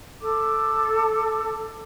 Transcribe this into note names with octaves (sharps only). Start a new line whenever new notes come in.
A4 D6